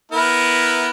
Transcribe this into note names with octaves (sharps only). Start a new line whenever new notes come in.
B3 E4 A#4